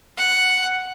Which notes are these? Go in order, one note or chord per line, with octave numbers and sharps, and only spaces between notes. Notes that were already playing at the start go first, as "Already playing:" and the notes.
F#5